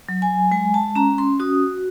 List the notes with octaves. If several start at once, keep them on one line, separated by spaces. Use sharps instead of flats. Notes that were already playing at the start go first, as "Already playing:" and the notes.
F#3
G#5
G#3 G#5
A5
C#4 A#5
C6
F#4 D#6